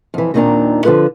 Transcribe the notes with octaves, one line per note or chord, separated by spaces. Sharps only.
F2 E3
D#2 A#2 D#3 C4 D4 A#5
D3 F3 F4 B4